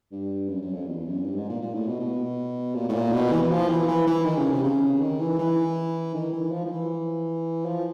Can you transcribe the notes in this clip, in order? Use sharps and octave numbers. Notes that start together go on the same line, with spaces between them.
G2
F#2
F#2
F2
E2
F#2
G2
G#2
A#2
A#2
A2
B2
B2
A#2
A2
A#2
B2
E3
E3
F3
E3
E3
E3
D#3
C#3
C3
C#3
D#3
E3
E3
D#3
E3
F3
F3
E3
F3